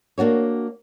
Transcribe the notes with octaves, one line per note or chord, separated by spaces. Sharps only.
A#3 D4 F#4 C#5